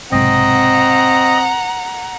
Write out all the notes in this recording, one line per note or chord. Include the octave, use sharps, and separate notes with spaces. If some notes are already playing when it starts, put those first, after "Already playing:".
B1 G#2 C3 C4 D#5 F#5 A#5